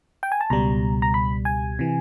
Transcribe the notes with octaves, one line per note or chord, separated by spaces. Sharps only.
G5
G#5
A5
C#2 B2 G3 A#5
A#5
B5
G#5
C3 E3